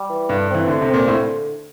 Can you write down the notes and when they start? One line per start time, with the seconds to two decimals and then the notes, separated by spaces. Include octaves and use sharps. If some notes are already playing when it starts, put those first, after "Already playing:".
Already playing: G3
0.10 E3
0.29 G2 D3
0.49 C4
0.54 E3
0.68 D3 A3
0.81 C3
0.88 C4
0.94 A#2
1.07 A2 D3